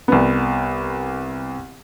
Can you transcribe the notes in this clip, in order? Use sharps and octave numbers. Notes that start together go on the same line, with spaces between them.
C2 B3